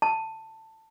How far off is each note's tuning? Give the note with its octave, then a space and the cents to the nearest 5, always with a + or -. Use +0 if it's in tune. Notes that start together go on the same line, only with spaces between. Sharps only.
A5 +15